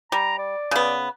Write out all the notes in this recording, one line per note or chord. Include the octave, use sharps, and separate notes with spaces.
G3 A#5
D5
C#3 B3